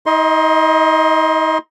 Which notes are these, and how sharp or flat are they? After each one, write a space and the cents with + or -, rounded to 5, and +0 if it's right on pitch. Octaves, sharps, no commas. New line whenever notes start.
D#4 +45 D#5 +0 C6 +15